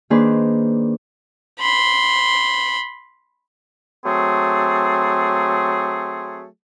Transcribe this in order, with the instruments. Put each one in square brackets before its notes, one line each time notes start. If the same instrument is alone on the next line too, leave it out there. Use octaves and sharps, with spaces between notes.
[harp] D#3 A#3 D4 G#4 B4 C5
[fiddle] B5 C6
[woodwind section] F#3 A3 C4 G#4